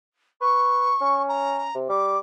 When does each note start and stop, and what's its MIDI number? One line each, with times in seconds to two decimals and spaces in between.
0.41 0.91 71
0.41 1.22 85
1.01 1.68 61
1.28 1.75 82
1.75 1.88 48
1.89 2.17 55
1.89 2.17 86